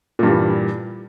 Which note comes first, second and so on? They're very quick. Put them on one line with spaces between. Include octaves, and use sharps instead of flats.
A#2 G2 G3 E3